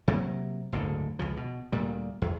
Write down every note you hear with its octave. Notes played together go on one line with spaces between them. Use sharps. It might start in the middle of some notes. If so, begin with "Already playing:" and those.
C3 F#3 A#3
F#1 D2 G#2 D3
C#2 C#3 F3
B2
D2 A#2 G3
E2